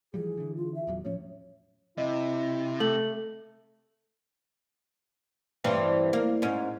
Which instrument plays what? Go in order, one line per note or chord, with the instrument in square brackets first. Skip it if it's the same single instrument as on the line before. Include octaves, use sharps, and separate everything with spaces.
[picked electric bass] E3 F3 G3 [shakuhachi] G#4
[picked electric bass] D3 E3
[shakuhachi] F4
E5
[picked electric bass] D#1 E2 F#3
[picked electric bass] A2 F3 C#4 [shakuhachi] C#5
[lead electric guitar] C3 [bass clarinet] E4 [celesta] D#5
[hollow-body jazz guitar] A3 [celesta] F#7
[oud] G2 E3 C4
A#3
G#2 C#4